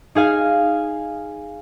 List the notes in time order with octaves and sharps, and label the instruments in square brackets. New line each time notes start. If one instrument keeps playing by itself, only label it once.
[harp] D#4 G#4 F5 G#5